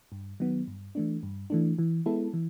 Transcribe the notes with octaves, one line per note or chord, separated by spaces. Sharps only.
G2
D#3 F#3 B3
G2
E3 A3 D4
G2
E3 A3 D4
E3
G#3 B3 E4 A4
E3